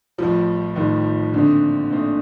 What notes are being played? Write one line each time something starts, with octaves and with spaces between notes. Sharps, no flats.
A1 A2 F3 G3
A1 A2 D#3 G3
A#2 D3 A3 C4 D#4
A#2 A3 C4 D#4